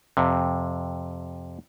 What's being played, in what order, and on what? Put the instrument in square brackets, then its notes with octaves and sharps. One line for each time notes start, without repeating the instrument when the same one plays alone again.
[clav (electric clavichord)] F2 C3